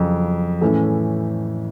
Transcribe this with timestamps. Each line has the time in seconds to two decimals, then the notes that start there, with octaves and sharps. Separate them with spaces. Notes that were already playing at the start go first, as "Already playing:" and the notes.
Already playing: F2 C#3 F#3
0.61 A2 E3 A3 C#4